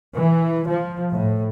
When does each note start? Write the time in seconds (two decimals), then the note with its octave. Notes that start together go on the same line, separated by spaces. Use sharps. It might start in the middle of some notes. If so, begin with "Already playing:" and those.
0.14 E3
0.69 F3
1.12 A2